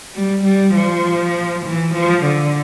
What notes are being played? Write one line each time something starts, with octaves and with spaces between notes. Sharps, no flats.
G3
G3
F3
E3
F3
D3